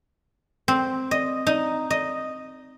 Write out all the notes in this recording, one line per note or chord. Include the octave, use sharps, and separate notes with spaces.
C4
D#5
D#4
D#5